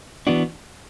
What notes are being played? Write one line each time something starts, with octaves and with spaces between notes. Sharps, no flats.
E3 B3 D4 F#4